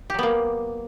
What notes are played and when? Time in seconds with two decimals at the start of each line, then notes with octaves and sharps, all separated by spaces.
0.10 G4
0.14 F#3
0.19 B3
0.23 A#3